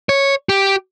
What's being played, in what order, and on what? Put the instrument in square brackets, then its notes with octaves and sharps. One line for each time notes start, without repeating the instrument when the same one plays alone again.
[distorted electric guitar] C#5
G4